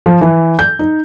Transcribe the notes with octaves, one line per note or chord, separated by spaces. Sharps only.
F3
E3
G6
D#4